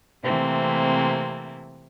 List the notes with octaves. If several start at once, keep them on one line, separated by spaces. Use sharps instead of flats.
C3 E3 A3 A#3 C4